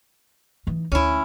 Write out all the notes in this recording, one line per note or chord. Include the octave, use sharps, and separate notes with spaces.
E3 D#4
D2 C#4 E4